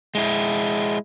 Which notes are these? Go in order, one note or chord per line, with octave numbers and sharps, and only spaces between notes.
G#3 E4